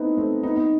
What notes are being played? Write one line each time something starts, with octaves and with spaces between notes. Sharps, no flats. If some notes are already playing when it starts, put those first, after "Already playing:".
Already playing: A3 B3 C4 D#4 E4
A3 C4
B3 D#4
B3 D#4